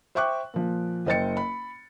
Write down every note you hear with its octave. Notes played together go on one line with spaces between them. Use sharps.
C5 E5 G5 C#6 D6 F#6
A#2 F3
F#1 C5 D#5 G5 A6 C#7
B5